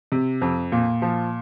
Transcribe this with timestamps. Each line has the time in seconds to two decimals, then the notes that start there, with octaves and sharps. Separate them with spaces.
0.12 C3
0.42 F2
0.72 A#2
1.02 F3